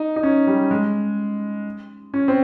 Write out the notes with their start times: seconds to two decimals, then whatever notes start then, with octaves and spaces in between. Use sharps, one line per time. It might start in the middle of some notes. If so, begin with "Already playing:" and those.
Already playing: D#4
0.16 D#4
0.23 C#4
0.47 G3
0.71 G#3
2.14 C#4
2.28 C4